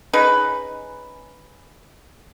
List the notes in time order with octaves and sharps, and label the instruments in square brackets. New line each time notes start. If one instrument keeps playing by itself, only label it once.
[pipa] C#4 D#4 G#4 B4